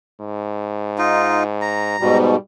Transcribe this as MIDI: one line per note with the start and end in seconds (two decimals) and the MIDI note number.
0.20 1.97 44
0.98 1.43 63
0.98 1.43 65
1.61 2.18 82
2.00 2.36 44
2.00 2.36 47
2.00 2.37 55